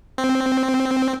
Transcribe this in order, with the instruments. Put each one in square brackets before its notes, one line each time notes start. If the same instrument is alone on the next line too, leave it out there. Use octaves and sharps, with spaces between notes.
[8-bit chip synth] C4